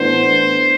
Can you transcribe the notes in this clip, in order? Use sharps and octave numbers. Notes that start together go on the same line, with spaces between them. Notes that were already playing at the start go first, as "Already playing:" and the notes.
Already playing: A2 E3 B3 D4 C5